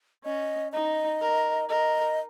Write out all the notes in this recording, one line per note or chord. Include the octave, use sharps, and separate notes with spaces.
C#4 D#5
D#4 D#5
A#4
A#4 D#5